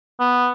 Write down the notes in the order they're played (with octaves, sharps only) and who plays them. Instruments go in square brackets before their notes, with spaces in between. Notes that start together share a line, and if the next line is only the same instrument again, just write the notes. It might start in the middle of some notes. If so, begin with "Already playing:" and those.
[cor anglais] B3